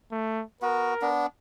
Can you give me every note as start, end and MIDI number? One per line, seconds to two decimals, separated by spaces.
0.12 0.43 57
0.62 0.94 59
0.62 0.94 66
0.62 1.11 70
1.02 1.26 59
1.02 1.26 62